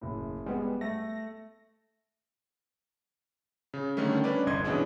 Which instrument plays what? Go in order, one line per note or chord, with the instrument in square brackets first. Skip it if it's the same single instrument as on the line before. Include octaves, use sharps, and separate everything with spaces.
[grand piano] F#1 A2
[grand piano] G3 [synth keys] G#3 B3
[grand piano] A3 [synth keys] A#6
[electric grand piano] C#3
D3 D#3 G3 A3 C#4
C#4 D4 B4 D5
G1 C2 D#5 C6 G#6
B2 E3 C#4 D4 G#4